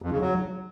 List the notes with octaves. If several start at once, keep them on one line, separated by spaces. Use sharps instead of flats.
F2
C#3
F#3